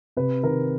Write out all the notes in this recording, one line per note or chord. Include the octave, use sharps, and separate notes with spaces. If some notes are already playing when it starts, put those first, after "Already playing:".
C3 B4
D#3 A#4